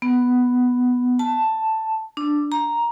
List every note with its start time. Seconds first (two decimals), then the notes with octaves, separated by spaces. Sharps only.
0.02 B3
1.19 A5
2.17 D4
2.52 A#5